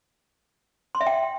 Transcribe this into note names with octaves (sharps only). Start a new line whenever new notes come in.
C6
E5
G5